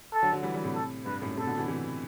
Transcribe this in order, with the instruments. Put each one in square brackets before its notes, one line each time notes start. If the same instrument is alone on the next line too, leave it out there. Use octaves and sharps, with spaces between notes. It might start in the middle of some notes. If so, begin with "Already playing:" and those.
[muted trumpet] A4
[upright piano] D3 F#3
D3 F#3
E3 G3
E3 G3
A2 C3
[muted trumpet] A4
[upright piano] G2 [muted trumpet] B4
[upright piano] F#2 A2
[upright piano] A2 C3 [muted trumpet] A4
[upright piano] B2 D3
C3 E3
C3 E3